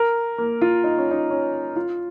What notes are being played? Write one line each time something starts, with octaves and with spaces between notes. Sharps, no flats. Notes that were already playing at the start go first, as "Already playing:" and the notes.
Already playing: A#4
A#3
F4
D#4
C#4
D#4
C#4
F4